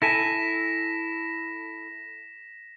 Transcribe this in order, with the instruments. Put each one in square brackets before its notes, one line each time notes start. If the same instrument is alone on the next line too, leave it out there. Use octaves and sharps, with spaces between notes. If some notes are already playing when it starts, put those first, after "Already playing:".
[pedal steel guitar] E4 A4 G#5 [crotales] A#6 B6 E7